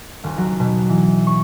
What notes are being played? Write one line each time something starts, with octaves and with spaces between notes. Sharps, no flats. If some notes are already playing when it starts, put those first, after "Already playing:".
D#1
F#3
B2
E3
C#6